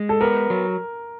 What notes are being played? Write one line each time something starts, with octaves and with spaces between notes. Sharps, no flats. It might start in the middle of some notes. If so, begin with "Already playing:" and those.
Already playing: G#3
A4
B3 A#4
F#3